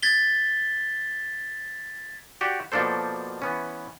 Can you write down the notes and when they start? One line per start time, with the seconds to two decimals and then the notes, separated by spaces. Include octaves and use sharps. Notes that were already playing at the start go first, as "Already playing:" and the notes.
0.02 G#6 A6 B6 G7
2.41 F#4 G4 D5
2.72 B2 F3 A#3 D4 A4 C5
3.42 E3 B3 C#4